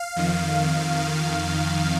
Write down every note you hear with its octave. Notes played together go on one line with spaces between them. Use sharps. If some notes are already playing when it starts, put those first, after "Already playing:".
Already playing: F5
F2 D#3
F2 D#3